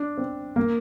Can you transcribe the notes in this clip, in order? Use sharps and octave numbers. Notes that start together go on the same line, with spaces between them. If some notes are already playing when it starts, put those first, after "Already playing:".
Already playing: D4
C4
A#3